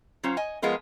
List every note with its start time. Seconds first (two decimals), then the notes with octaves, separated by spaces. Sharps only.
0.23 F#3 C#4 F4 C5
0.37 D#5 G#5
0.62 F3 G#3 B3 F4 A#4